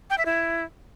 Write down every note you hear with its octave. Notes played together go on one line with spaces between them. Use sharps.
G5
E5
E4